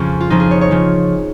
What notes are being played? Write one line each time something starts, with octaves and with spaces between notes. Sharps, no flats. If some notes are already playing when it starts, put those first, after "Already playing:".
Already playing: F2 C#3 F3 C#4
F4
F2 C#3 F3 D#4
G#4
C#5
C#5
C#3 F3